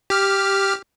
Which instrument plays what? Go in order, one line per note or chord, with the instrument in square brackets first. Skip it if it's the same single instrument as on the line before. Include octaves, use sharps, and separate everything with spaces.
[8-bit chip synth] G4 F6